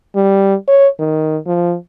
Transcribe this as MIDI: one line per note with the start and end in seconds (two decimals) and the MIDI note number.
0.16 0.55 55
0.68 0.88 73
0.99 1.37 51
1.47 1.75 53